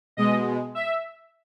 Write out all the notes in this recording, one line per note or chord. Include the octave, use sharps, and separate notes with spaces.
B2 G#3 D#5
E5